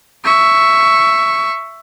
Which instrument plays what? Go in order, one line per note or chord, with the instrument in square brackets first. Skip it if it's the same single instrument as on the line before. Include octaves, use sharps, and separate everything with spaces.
[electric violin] E5 C#6